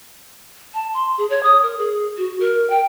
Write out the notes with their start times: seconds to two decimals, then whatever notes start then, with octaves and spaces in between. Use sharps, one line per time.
0.74 A5
0.94 C6
1.18 G#4
1.30 C#5
1.43 D#6
1.62 A#4
1.78 G#4
2.18 F#4
2.40 A#4
2.70 G5